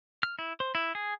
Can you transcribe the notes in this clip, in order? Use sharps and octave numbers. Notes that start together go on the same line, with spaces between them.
F6
E4
C5
E4
G#4